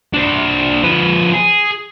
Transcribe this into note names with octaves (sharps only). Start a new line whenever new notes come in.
D4 C5
F3 B4
G#4